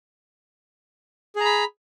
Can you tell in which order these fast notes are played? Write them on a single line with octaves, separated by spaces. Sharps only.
G#4 A#5 B5